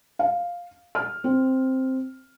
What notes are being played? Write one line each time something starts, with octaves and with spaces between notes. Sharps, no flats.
F5
F6
C4